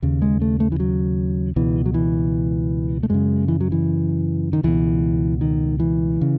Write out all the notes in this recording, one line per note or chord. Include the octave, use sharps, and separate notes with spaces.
D#2 C#3
G#3
A3
A3
E3
F#3
C#2 B2 E3
F#3
E3
A3
F#2 C#3 G#3
E3
F#3
E3
D#3
C#2 B2 E3
D#3
E3
C#3